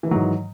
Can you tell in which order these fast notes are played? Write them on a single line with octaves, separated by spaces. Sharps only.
E3 D#3 F#3 G#2